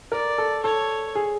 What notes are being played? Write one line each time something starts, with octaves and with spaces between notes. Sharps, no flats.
A#4 D5
A4
A4 C#5
G#4